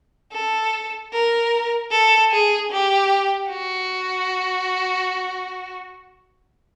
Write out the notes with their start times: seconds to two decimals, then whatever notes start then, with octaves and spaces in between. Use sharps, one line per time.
0.32 A4
1.13 A#4
1.91 A4
2.32 G#4
2.71 G4
3.50 F#4